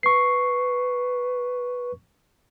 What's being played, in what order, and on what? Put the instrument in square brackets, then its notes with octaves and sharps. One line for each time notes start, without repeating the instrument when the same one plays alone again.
[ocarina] B4 [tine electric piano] C#6 C7